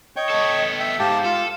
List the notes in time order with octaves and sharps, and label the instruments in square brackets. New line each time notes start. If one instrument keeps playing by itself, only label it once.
[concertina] C#5 G5 C#6 [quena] D#5
[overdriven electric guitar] B3 A4
[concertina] E5 G5
[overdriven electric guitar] G#2 [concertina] G4 A5 [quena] F5
[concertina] F4 [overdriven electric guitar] A4